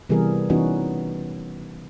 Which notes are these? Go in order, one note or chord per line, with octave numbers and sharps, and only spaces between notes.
C3 E3 G3 B3 G#4 A#4
E3 B3 C#4 D#4 F#4